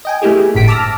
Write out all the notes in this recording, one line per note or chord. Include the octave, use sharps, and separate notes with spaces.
D#5 G5 G#5
A3 A#3 E4 G4 G#4
G1 A2 B6 D7
A5 D6 E6 F6 A#6